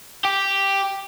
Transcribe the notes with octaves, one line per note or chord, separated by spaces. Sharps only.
G4